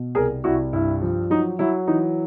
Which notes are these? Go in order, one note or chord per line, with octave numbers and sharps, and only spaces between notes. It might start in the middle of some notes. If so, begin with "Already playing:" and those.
Already playing: B2
C2 G#4 A#4
C2 E4 F#4
G2 E4
F3
F#3 D#4
F#3 E4
E3 D#4